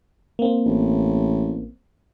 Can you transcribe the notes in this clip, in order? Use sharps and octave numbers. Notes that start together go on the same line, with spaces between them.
A#3 C4
A1